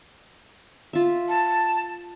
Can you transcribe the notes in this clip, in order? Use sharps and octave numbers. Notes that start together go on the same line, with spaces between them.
F4 E5
A5